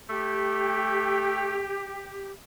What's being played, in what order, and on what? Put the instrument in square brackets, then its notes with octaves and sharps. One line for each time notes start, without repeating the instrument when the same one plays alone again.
[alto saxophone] A3 [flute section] G4